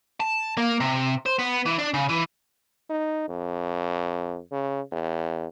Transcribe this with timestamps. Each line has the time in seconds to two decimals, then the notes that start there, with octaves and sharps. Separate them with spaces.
0.20 A5
0.57 A#3
0.80 C3
1.26 C5
1.39 B3
1.66 E3
1.79 D4
1.94 C#3
2.09 E3
2.90 D#4
3.28 F2
4.51 C#3
4.92 E2